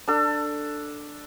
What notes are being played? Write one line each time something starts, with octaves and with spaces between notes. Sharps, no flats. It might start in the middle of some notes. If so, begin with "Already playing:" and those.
D4 A4